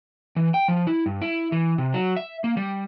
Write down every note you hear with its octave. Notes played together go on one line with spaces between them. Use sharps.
E3
G5
F3
E4
G2
E4
E3
C3
F#3
E5
A#3
G3